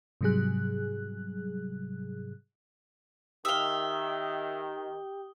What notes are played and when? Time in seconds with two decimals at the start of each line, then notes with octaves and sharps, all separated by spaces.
0.21 G#2 C3 F#3 G3 G#4 F#6
3.45 D#3 G4 E5 F5 D#6 G7